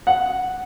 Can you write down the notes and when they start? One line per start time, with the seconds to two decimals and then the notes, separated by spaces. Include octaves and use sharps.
0.07 F#5